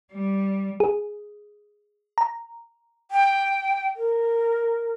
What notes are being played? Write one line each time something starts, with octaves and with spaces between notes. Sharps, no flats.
G3
G#4
A#5
G5
A#4